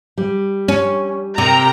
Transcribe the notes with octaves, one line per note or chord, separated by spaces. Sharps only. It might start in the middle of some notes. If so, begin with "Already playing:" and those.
G3
C#4
C3 A#4 G5 A#5